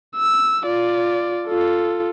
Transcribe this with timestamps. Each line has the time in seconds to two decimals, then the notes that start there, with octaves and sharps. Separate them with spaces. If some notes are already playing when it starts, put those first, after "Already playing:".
0.16 E6
0.65 F4 D5
1.48 F4 A4